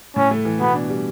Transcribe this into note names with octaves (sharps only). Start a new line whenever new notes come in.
A2 C#4
A3
E3
B2 B3
D4
G3